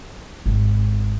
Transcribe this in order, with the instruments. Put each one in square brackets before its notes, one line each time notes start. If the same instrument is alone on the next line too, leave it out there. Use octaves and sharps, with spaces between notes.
[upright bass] G#1